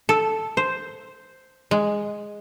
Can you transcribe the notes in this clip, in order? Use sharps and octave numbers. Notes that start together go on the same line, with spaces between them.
A4
C5
G#3